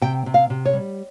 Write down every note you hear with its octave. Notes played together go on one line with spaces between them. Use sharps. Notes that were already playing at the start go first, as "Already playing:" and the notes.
C3 G5
C3
F5
C3
C#5
G3